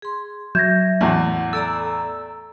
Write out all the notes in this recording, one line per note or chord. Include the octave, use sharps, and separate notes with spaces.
G#4 C6
F#3 E5 G6 G#6 A#6
E2 A2 F#5
A4 D5 A#5 E6